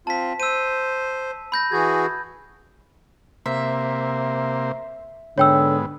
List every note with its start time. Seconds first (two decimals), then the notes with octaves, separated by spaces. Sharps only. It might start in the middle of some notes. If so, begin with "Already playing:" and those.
0.07 C4 F4 A5 B6
0.40 C5 E6 D#7
1.52 B5 G6 A#6
1.72 E3 F#4 G#4 G#6
3.46 C3 A#3 C5 E5
5.38 G#2 D3 B3 C#5 G5 E6